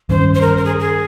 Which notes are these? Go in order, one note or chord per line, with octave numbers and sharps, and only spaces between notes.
G2 D#3 G3 C#4 C5
C5
A#4
A#4
G#4
G#4